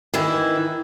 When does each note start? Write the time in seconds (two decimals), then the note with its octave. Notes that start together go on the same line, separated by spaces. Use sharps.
0.14 D#3 E3 E4